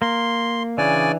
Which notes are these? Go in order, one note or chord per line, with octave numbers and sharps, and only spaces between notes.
A#3 C6
C#3 E3 D4 D5 G#5